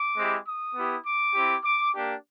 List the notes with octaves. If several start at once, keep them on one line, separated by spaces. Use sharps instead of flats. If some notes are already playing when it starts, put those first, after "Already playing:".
Already playing: D6
G#3 C4 E4 G4
D#6
B3 E4 G4
D6
C4 E4 G4
D6
A#3 D4 G4